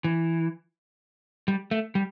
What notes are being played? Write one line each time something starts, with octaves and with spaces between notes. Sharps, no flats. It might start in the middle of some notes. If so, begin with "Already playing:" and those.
E3
G3
A3
G3